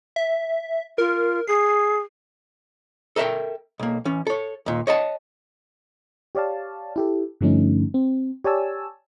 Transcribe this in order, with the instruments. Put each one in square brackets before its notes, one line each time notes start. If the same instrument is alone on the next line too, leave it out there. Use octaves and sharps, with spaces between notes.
[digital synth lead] E5
[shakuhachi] F4 [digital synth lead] A#4
[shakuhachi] G#4 [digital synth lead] C7
[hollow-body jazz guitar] A4 A#4 E5 F#5 G5
B1 A#3
E3 C#4
A4 C#5
D#2 A#2
C#5 D#5 F#5 A5
[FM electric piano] G4 C#5 D5 F5 A5
E4 G4 A4
G2 D3 F3 A3 C#4 D#4
C4
G4 C#5 D5 G#5 A5 E6